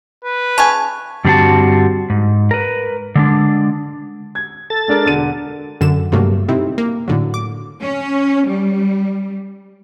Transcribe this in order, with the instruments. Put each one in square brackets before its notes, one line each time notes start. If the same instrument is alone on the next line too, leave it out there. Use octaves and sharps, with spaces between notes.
[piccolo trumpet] B4
[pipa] C#3 G#5 [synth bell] A5 C#6
[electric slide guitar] G2 D3 G3 C4 F#4 A5
G#2
A#4 B4
D3 G#3 D4
[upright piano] G#6
[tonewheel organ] A4 A6
[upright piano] G#3 D4 A#4
E1 D3 D#7
[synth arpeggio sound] F#2 D3 E7
G2 C3 F#3 A3 A#3
C3 C4 D#4 E4
A#3
A2 D3 F#3
D6
[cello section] C#4
G3